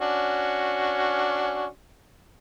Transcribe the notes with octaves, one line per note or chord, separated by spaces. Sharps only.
C#4 D4 F#4